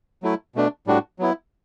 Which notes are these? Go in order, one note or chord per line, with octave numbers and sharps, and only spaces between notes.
F#3 A3 E4
B2 A3 D4
A2 G3 D4 F#4
F#3 B3 E4